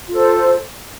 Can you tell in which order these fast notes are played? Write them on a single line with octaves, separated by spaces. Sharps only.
F4 A4 C5